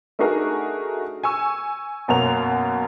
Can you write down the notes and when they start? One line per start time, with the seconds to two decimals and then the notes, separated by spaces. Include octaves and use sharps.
0.19 A3 D4 D#4 F#4 G#4 A#4
1.24 G#5 C#6 E6
2.08 F#2 B2 A#3 C#5 F7